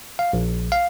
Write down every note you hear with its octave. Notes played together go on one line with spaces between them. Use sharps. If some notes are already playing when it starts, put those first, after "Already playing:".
F5
A#1
F5